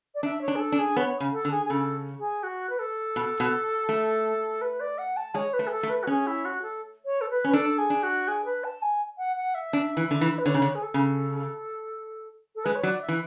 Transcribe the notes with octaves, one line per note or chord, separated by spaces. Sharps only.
D5
D4 E5
C#5
D4
G#4
A4
D4
G#4
B3 C#5
C#3
A4
D3
G#4
G#4
C#3 A4
G#4
F#4
B4
A4
B2
B2
A3
B4
D5
F#5
A5
G#3 C#5
B4
A3
G#4
A4
A3
B4
F#4
C#4 G#4
E4
F#4
A4
C#5
A4
B4
C#4
B4
D4 A4
G#4
D4
F#4
G#4
B4
A5
G#5
F#5
F#5
E5
D4
E3
D3
E3
B4
D3 C#5
C#3
D3
G#4
A4
C#3
A4
G#3 B4
C#5
F#3 D5
E5
E3